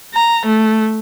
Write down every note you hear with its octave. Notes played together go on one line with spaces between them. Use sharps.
A#5
A3